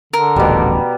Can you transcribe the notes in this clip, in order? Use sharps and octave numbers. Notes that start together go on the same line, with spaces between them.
D3 A#4
D#1 A1 B2 G3